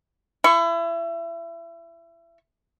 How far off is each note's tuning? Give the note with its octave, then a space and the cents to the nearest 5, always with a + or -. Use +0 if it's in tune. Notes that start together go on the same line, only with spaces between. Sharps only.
E4 +30 C#6 +0